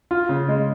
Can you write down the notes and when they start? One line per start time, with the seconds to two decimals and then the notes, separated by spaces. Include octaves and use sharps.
0.11 F4
0.29 C#3
0.49 G#3